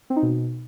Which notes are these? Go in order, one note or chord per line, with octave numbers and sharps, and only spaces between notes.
C4
D#4
B2